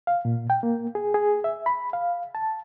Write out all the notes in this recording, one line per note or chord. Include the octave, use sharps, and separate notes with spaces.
F5
A#2
G5
A#3
G#4
G#4
E5
B5
F5
A5